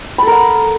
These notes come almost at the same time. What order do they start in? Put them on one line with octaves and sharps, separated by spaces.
B5 A4 A#4 F#5